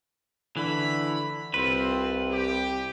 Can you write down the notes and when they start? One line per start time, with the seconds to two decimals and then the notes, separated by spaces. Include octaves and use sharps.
0.57 D3 E3 A3 E4 B5
1.54 C2 C4 F4 B4
2.31 G4